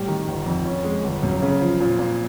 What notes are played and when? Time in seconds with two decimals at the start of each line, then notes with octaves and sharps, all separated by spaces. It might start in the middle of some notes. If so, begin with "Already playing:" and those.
Already playing: A2 G3
0.08 D#3
0.28 G1
0.46 F2
0.65 C#4
0.84 G#3
1.04 G1
1.23 F#2
1.42 C#3
1.61 F3
1.80 A#2
1.99 A#2